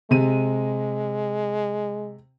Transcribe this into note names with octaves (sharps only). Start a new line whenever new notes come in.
C3 G#3 D#7